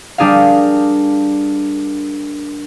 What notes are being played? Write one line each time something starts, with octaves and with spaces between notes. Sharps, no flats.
G3 D4 G#4 A#4 F5